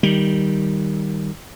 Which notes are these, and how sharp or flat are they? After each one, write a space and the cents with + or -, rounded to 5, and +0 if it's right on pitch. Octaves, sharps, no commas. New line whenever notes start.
D#3 +0 G3 +0